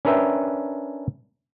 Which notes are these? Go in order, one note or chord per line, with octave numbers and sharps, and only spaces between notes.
C#4 D4 A#4 B4 E5 G5